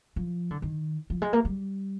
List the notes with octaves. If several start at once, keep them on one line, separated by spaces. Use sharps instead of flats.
F3
D3
D#3
F3
G#3
A#3
G3